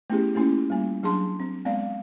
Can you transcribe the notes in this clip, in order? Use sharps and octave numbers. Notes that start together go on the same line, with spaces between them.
A3 B3 C#4 E4 G4 G#4
A3 A#3 C#4 E4 F4
G3 A#3
F#3 D4 G#4 A5 C6
C4
G#3 B3 C4 D5 F5